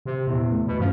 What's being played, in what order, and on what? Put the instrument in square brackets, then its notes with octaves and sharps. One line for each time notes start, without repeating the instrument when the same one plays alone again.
[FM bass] C3
[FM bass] E2 [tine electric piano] A#2
[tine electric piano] A3
[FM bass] B2
[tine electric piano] G2 C#4 [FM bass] F3